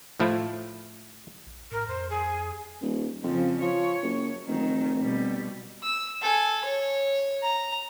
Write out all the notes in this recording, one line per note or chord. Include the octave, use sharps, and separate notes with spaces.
A2 F3 A3 E4
A#1
A2 A#4
F2 C5
G#4
D#1
F2 C#3 F3
F3 C#5
F#1
F1 D#3 F#3
B2 G3
E6
A4 G#5
C#5
A#5